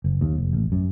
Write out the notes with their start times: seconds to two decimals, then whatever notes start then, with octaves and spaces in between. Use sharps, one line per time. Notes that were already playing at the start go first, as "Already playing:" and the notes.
0.04 F#1
0.21 D#2
0.38 F1
0.53 A1
0.72 F#2